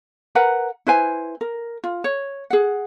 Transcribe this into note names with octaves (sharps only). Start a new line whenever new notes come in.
A#4 B4 F#5 A#5
E4 B4 C5 G#5
A#4
F4
C#5
G#4 F#5